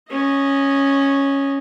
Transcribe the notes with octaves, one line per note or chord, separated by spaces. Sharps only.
C#4 D#5